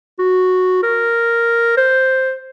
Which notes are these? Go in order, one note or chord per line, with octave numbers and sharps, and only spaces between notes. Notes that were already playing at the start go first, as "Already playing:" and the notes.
F#4
A#4
C5